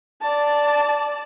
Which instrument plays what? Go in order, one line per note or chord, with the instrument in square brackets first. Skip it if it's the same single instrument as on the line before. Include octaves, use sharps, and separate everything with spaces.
[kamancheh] D5 A5